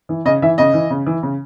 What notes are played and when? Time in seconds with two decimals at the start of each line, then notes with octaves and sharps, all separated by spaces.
0.09 E3
0.25 C#3 D#5
0.42 E3 E5
0.58 C#3 D#5
0.74 E3
0.90 C#3
1.07 E3
1.23 C#3